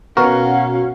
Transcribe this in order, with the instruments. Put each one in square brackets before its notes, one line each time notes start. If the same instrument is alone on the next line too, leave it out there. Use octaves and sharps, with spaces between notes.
[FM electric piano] B2 F#4 [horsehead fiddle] C#4 F5 [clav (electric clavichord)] A#4